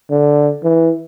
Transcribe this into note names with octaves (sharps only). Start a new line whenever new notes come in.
D3
E3